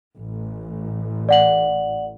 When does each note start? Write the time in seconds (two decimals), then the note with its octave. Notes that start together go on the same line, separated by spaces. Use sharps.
0.16 A1
1.29 D5 F#5 F#7